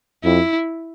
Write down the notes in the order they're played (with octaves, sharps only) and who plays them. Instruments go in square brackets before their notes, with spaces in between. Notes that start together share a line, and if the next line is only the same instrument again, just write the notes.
[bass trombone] F2 [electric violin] E4